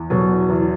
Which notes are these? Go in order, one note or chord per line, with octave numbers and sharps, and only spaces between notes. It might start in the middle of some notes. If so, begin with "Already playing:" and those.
Already playing: E2
B2 F#3
E2